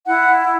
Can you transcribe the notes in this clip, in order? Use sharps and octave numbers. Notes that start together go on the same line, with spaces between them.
E4 F#5